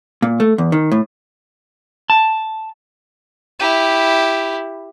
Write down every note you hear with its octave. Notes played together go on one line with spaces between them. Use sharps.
A#2
A3
E2
D#3
A2
A5
E4 G4